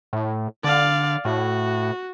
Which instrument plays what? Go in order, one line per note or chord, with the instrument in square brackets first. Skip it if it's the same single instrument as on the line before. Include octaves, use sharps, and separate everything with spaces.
[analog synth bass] A2
[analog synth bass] D3 [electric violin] D5 F5
[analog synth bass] A2 [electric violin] F#4